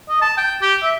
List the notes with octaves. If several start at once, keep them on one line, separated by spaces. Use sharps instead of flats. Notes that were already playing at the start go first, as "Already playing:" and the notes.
D#5
A5
G5
G4
E5